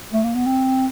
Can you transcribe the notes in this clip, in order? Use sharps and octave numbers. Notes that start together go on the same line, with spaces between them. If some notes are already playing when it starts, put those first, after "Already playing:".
A3
A#3
B3
C4